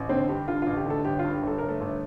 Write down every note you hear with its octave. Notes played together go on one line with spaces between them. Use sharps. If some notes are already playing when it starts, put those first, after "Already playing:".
Already playing: A1
D3 C4 C5
G2 G4
D3 F4
A1 F4
G4
D3 A3 A4
G1 G4
F4
G2
G4
G1 A4
G1 A#4
A3 A4
G1